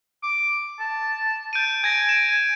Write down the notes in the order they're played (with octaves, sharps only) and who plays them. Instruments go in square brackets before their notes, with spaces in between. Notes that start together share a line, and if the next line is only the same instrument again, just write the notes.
[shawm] D6
A5
[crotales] G6 D7 D#7
[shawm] G#5 [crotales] G#6 A#6 D7
[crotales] E7